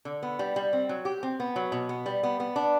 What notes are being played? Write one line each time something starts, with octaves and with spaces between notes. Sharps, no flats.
D3
B3
G3
G3
C4
F#3
G4
C4
B3
F#3
B2
B3
G3
B3
B3
D4